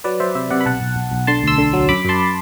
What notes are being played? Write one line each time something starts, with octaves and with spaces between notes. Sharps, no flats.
F#3 B4 D5
F#3 C5 E5
C3 C5 E5
C3 D5 F#5
B5
B1 F#5 A5
B1
B1
B1
D3 A5 C6
D2 C6 E6
D3
F#3
F#2 B5 D6
F#2 A5 C6